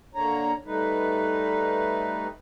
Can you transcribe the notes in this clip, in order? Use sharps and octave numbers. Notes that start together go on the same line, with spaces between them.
D3 A#3 D4 C#5 A#5
G3 A3 D#4 B4